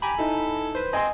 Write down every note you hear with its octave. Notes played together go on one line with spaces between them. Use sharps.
G4 G#5 A#5 B5
D#4 E4 A4
B4 C5
C4 D#5 G#5 C6